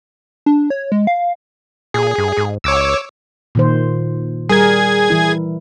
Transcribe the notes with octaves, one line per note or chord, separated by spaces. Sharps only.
D4
C#5
G#3
F5
A#2 G#4
G2
G#2
C#2 C#5 D6 E6
A#2 D#3 C5
G3 G#4 A#4 G#6
E3 E4